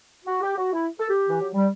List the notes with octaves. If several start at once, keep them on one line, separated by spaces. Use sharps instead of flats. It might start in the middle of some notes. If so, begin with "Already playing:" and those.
F#4
G4
F#4
E4
A4
G4
E3
F#3
G3